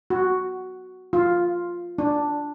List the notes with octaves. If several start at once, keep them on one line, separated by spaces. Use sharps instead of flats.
F#4
F4
D4